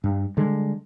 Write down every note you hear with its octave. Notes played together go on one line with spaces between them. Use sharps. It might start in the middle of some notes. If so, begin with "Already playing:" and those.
G2
D3 G3 G#3